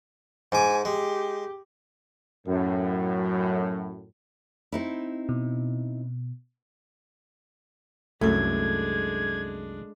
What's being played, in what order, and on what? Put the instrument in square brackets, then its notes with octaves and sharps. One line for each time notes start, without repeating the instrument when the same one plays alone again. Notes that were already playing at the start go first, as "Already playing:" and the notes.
[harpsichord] G#2 D6 [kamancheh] G#5
[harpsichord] G#3 [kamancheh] G4
[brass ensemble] F#2 A2
[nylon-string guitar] C4 D#4 E4
[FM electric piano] B2
[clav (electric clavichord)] C2 F#2 [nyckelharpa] G#3 D4 [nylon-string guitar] A3 [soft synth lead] G#6